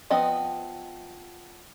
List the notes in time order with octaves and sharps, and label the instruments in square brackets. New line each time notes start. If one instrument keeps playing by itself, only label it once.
[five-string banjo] F3 B3 C4 D#5